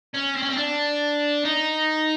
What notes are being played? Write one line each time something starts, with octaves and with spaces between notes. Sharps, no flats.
C#4
C4
C#4
C4
D4
D#4